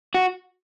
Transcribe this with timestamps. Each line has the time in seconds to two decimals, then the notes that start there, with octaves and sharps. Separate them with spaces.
0.14 F#4